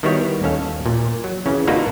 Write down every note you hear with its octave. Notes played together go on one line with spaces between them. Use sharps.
D#3 G3 B3 E4 F#4 C#5
D#2 C#4 A4 F5
A#2
F#3
C#3 E3 C#4
A#3 D4 D#4 F4 F#4 B4